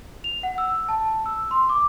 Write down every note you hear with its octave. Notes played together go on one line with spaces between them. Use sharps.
F7
F#5
E6
A5
E6
C6
D6